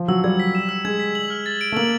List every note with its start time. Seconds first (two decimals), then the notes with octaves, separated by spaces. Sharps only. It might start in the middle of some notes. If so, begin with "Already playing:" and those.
Already playing: F3
0.08 F#3 E6
0.24 G3 G#6
0.40 B6
0.55 E7
0.69 E6
0.85 G#3 G#6
1.00 B6
1.15 F#7
1.30 F6
1.46 A6
1.61 D7
1.72 A3
1.76 A#3 F#7